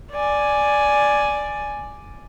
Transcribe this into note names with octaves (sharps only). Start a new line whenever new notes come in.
D5 G#5